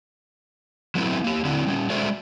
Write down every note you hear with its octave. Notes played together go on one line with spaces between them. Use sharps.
F#3 A3 B3 C4 E4
A#3 G4
D3 F#3 C4 D4 E4
G3 C4 C#4
G#3 F#4 A4 C5 D5 E5